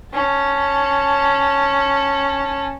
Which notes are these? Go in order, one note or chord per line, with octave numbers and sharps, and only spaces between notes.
C#4 A5